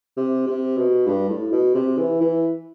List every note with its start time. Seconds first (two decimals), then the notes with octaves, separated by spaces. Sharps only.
0.17 C3
0.47 C3
0.77 B2
1.07 G2
1.29 A2
1.52 B2
1.75 C3
1.97 E3
2.21 E3